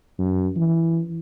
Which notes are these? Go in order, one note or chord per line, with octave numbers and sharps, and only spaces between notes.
F#2
E3